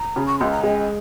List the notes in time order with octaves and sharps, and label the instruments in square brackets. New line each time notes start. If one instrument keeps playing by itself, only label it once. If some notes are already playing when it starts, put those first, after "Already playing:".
Already playing: [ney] A#5
[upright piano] C#3
[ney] C#6
[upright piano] C#2 [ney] C6
[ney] A#5
[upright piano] G#3 [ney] G#5